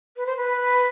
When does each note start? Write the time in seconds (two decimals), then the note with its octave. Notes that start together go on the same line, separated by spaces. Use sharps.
0.16 B4
0.26 C5
0.37 B4